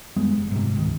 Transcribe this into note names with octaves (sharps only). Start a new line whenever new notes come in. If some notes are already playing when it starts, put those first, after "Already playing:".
F#2 G3 G#3 B3
F#1
G#2 C3
D1 C#2 D#3